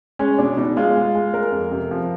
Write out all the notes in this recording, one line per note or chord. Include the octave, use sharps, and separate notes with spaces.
G#3 C#4
B2 D4
B2 D#4
G#3 F4
G#3
G#3
G#3 A#4
F2
C3
F3